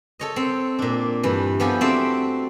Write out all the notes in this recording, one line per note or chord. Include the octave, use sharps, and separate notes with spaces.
A4 C#5 D#5
C4
A#2 D4
G2 E3
F3 B3 G4 A4 G#5
A3 C4 F#4 C5 D5 E5